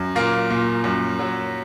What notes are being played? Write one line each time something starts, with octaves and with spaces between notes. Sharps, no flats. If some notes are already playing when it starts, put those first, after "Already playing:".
Already playing: F#2
A#2 A#3
A#2
F#2
F#3